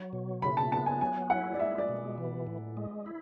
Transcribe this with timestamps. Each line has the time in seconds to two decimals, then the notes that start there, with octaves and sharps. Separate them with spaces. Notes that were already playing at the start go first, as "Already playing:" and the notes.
Already playing: F#3
0.13 B2
0.42 C#3 B5
0.57 A5
0.71 B3 A5
0.86 G#5
1.01 F#3 G#5
1.30 E4 F#5
1.54 D5
1.59 G#3 E5
1.78 D5
1.89 B2
2.18 E3
2.47 A2
2.77 G#3
3.06 E4